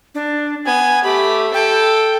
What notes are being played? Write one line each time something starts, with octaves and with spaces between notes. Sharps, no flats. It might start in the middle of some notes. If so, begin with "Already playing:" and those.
D4
B3 G#5
A3 G4 B5
A4 G5